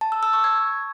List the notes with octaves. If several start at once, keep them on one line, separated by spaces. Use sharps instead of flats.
A5
E6
E6
C#6
G#6